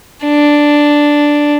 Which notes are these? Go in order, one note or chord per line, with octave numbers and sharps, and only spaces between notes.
D4